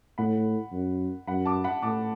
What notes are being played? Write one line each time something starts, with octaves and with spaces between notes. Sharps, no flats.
A2 F#5 B5
F#2
F#2 F#5 B5
A5 D6
F#5 B5
A2 A5 D6